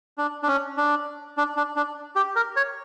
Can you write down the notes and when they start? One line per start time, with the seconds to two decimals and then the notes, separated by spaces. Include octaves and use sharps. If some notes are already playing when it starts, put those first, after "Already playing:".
0.18 D4
0.43 D4
0.48 C#4
0.77 D4
1.37 D4
1.57 D4
1.76 D4
2.16 G4
2.36 A#4
2.56 C#5